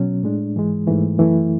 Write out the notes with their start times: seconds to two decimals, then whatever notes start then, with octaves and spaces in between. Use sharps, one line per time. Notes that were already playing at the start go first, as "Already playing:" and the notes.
Already playing: B2 F#3 C#4
0.23 A2 G#3 D4
0.56 G#2 E3 G#3
0.87 G#2 E3 A3
1.18 F#2 E3 A3 E4